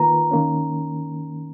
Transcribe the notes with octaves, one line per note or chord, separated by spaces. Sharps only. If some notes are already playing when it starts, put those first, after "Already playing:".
Already playing: D#3 A#3 F4 B4 A#5
D#3 A#3 C#4